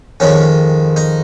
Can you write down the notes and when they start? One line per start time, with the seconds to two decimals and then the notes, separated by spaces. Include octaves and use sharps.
0.20 F2 D#3 G#3 C#4
0.96 D#4